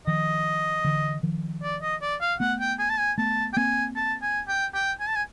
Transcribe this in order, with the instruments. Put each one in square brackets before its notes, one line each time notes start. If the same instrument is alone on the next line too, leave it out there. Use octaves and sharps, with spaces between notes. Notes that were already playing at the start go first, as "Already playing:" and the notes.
[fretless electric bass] D#3 F3 [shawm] D#5
[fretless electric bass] D3 E3
D#3 F3
[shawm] D5
D#5
D5
F5
[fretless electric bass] A3 B3 [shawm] F#5
[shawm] G5
G#5
A5
G#5
[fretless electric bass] A3 B3 [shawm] A5
[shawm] G5
[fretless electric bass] A#3 C4 [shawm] G#5
[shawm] A5
G#5
G5
G5
G#5
A5
G#5